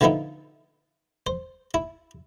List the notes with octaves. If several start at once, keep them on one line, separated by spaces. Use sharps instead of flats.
D3 E3 F3 B3 D#4 E4
C5
E4